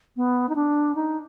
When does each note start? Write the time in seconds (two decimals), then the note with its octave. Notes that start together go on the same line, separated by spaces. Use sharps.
0.16 B3
0.49 D#4
0.55 D4
0.95 D#4